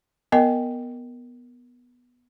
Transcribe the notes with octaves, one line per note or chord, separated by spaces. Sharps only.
B3 A#4 D#5 G5